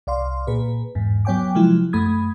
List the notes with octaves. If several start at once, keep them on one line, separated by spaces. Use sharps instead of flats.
C2 D5 F5 C6
A#2 G#4 B4
E2 G#2
F#3 B3 C#5 G5 G#5 D6
C3 F3 F#3 G#3 E4
F#2 A3 B5 D#6 G#6